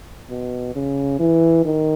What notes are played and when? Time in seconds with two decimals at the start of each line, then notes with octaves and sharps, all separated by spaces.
0.30 B2
0.75 C#3
1.20 E3
1.65 D#3